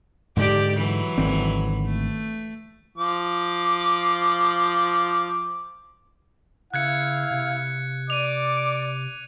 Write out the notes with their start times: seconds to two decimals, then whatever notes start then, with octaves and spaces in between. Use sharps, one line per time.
0.37 G#2 D3 G#3 G4 D5
0.76 E3 F#3
1.18 G#1 D3 C4
1.85 A3
2.98 F3 D6
6.74 C#3 E4 F5 F#6 G#6 C#7
7.31 C3
8.10 D5 D6 D#7 F7